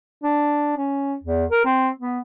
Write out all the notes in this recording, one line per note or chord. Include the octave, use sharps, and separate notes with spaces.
D4
C#4
E2
A#4
C4
B3